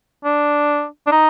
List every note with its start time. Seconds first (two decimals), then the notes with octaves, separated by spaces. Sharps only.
0.25 D4
1.07 D4
1.12 D#4